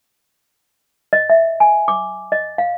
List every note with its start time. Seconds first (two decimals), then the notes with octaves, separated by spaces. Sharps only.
1.13 D#5
1.30 E5
1.60 G#5
1.88 D6
2.32 D#5
2.58 F5